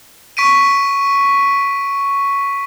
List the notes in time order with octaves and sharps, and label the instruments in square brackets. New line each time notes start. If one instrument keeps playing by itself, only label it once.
[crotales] C#6 B6 D7 D#7